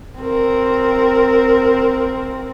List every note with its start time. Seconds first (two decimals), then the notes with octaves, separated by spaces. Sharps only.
0.19 C4 A#4